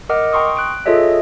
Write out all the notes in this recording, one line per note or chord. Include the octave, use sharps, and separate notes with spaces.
A#4 D#5 F#5 D6 F6
G5 A#5 C6 C#6 D#6
F#6 D7
F4 G#4 A4 C#5 D#5 E5